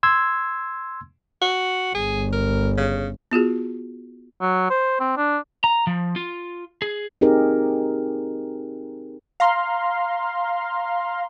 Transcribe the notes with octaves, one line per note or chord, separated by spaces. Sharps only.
C6 E6 G#6
F#4
G1 G#4
A#4
C#3
B3 F4 F#4 G#4
F#3
C5
C4
D4
A#5
F3
F4
G#4
C4 D#4 G4 G#4 A#4
F5 A#5 C6